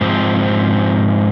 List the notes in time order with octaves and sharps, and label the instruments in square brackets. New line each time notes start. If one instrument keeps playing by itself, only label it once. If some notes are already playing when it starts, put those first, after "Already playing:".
[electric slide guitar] G#2 F3 C4